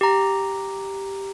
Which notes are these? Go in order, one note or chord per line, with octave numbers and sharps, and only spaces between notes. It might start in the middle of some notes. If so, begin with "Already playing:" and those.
G4 A#5